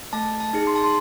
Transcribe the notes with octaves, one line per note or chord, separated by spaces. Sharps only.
A3 A5
A5
D#4 G#4
C6
A5
C6